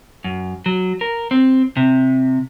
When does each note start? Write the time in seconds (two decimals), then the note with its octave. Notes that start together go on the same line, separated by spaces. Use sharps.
0.24 F#2
0.66 F#3
1.01 A#4
1.31 C4
1.77 C3